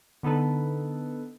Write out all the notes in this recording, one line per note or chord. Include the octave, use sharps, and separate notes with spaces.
D3 B3 D#4 A4 B4